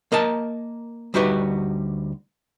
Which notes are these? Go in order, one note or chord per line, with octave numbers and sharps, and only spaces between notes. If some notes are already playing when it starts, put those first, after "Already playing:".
A#3 A#4 D#5 A5
D2 G3 D#4 F#4 G4 B4